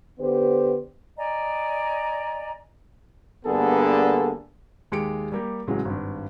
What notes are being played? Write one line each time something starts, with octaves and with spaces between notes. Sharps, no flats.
D3 B3 G4 B4 C5
D5 D#5 G#5 A#5
G2 D3 A#3 B3 G#4 A4
D#2 G#3 G4 G5 C#7 D7
G3 A#3 G4
A1 A2 C#3 F#3 G#3
G#1 G2